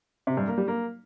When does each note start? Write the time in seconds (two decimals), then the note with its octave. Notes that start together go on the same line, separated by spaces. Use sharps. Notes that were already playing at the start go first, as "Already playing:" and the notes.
0.27 C3
0.37 G2
0.47 A#3
0.58 G3
0.68 A#3